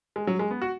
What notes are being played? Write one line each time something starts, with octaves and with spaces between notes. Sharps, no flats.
G#3
F#3
G#3
B3
F#4